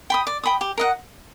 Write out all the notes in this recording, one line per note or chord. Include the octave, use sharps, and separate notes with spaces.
G5 B5 D#6
D5
G5 B5 D#6
G4
A#4 D#5 F#5